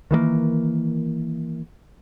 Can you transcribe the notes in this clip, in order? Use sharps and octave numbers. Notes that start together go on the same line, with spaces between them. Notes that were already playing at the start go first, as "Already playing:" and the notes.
D#3 E3 G#3 A#3